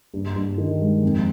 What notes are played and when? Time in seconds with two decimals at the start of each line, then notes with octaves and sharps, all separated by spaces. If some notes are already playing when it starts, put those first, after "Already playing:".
0.14 G2
0.36 G2
0.58 D#3
0.81 G#3
1.03 F2